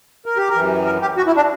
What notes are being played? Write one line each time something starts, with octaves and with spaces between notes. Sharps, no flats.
A#4
G4
A#4
F#2 E3
A#4
G4
F#4
E4
D4